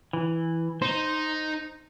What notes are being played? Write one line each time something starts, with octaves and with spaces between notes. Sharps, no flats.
E3
D#4 C5